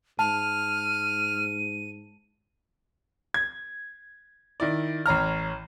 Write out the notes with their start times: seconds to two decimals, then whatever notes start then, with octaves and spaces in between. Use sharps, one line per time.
0.19 G#2 A5 F6 D#7
3.34 G#6
4.60 D#3 E4 D5
5.06 A1 C#5 A#5 F6